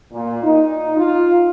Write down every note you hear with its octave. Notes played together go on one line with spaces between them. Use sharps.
A#2
D#4
F4